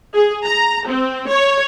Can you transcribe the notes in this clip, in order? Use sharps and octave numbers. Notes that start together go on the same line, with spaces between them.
G#4
A#5
C4
C#5